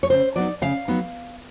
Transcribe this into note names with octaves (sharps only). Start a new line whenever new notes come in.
C#5
C#3 C5
F#3 B3 D#4 D5
C#3 F5
F#3 B3 D#4